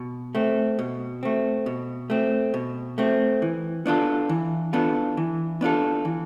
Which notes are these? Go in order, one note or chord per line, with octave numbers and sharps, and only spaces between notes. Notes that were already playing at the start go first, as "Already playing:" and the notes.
Already playing: B2
A3 C4
B2
A3 C4
B2
A3 C4
B2
A3 C4
E3
B3 D4 F4 A4
E3
B3 D4 F4 A4
E3
B3 D4 F4 A4
E3